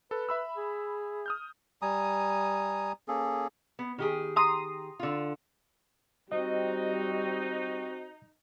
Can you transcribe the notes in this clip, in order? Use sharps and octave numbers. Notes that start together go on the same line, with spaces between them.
A4 B4
E5 B5 E6
G#4
D#6 F6 G6
G3 G#5 A#5 D#6
A#3 C#4 G#4 A4
B3
D#3 G4 G#4
A#5 C6 D#6
D3 F4
G3 C4 D#4 F#4 D#5